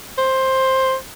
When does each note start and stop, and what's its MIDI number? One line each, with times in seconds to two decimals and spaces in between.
0.18 0.96 72